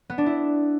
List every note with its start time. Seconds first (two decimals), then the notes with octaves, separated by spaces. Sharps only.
0.10 B3
0.18 D4
0.26 E4